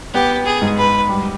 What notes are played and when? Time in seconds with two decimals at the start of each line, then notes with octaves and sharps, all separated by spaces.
0.14 B3 G4
0.46 G#4
0.62 G#2
0.78 B4
1.09 G3